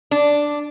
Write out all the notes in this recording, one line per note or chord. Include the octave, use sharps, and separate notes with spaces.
D4